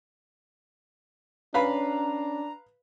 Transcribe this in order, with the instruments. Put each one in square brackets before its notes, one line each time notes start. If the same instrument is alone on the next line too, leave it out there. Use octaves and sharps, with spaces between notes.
[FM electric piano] C#4 [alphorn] D4 [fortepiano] B4 F5 B5 [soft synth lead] A#5